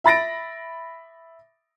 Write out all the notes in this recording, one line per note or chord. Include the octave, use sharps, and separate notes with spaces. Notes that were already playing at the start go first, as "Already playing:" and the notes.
E5 B5 A6 A#6 D7